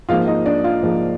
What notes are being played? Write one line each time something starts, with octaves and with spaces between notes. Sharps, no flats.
G#2 F3 A#3 F4 F5
D#4 D#5
D4 D5
F4 F5
G#2 F3 A#3